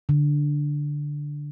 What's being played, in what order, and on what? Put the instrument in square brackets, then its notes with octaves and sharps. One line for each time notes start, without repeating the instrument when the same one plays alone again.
[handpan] D3